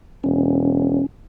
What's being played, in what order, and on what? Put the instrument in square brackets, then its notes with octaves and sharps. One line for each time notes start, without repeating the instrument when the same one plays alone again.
[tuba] E1 [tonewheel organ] C#4